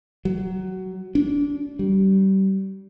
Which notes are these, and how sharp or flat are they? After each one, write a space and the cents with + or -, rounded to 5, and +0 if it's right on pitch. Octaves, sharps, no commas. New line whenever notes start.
F#3 +15
D4 -25
G3 -30